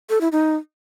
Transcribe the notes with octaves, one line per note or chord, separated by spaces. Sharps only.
A4
E4
D#4